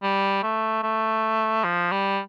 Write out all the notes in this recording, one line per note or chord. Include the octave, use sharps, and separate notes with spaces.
G3
A3
A3
F3
G3